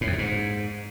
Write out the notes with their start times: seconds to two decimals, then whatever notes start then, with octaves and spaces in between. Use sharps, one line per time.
0.01 A2
0.07 F2
0.13 C3
0.18 G#2